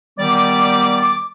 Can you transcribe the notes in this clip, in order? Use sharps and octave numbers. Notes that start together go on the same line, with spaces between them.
D#3 G3 B3 D5 D6